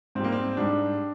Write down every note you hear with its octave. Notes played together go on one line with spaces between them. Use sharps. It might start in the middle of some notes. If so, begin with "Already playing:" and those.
G#2 G3 A#3 C4
C4
G#2 G3 D4